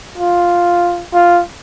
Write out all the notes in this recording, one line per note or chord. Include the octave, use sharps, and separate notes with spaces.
F4
F4